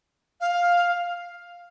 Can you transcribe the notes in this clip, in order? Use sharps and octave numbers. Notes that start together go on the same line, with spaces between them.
F5